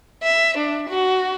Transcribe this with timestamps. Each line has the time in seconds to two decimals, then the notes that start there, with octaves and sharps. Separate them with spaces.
0.23 E5
0.57 D4
0.89 F#4